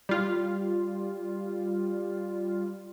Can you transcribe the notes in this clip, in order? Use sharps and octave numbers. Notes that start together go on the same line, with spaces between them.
G3 F4